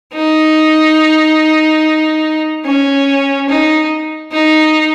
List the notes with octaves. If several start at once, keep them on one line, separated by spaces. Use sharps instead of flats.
D#4
C#4
D#4
D#4